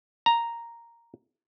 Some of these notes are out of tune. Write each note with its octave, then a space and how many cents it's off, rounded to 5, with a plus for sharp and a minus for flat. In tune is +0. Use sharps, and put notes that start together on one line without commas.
A#5 +0